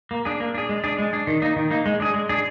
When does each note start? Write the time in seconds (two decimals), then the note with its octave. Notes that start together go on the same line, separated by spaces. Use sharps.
0.11 A#3
0.25 D4 G#4
0.40 A#3
0.54 D4 G#4
0.69 G#3
0.84 D4 G#4
0.98 G#3
1.13 D4 G#4
1.27 D#3
1.42 A#3 D#4
1.56 D#3
1.71 A#3 D#4
1.86 G#3
2.00 D4 G#4
2.14 G#3
2.29 D4 G#4